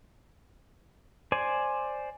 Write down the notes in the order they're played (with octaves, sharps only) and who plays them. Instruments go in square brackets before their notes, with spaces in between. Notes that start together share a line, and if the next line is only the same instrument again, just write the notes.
[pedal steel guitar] C5 D5 G#5